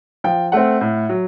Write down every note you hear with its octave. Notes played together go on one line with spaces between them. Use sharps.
F3 G5
A3 C4 F#5
A2
F#3